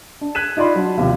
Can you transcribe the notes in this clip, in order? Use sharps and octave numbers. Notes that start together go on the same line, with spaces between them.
D4
F#6 G#6 B6 D#7 E7
D#4 F4 D5 B5 C6
F#3 D4
D#2 C3 F3